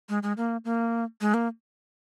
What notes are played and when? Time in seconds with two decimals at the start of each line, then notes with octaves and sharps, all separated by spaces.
0.09 G#3
0.23 G#3
0.37 A#3
0.65 A#3
1.21 G#3
1.34 A#3